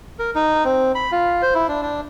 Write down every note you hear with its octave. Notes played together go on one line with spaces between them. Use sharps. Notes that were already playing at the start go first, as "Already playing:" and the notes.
A#4
D#4
C4
B5
F4
C5
E4
D4
D4